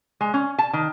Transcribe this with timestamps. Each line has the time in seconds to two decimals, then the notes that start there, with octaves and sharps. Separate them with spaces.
0.21 G#3
0.34 C#4
0.58 A5
0.73 D#3